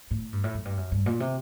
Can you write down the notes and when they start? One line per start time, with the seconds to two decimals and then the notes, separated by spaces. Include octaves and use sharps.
0.11 A2
0.33 G2
0.44 A2
0.54 F#2
0.65 G2
0.77 F#2
0.92 G2
1.06 A#2
1.20 C3